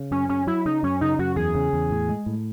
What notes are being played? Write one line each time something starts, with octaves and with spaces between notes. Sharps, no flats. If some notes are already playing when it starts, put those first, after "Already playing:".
Already playing: C#3
F#2 C#4
C#3 C#4
F#3 E4
C#3 D#4
F#2 C#4
C#3 D#4
F#2 F#4
E2 G#4
C#3
E2
A2
G#3
A2